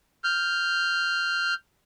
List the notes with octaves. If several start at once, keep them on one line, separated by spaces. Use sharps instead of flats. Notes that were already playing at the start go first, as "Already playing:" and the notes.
F6 G6